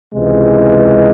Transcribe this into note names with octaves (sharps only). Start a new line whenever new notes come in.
C#2 C3 E3 G#3